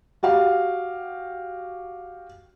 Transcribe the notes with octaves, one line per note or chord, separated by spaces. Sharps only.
F#4 G4 F5